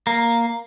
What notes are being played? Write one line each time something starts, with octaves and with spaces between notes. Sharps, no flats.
A#3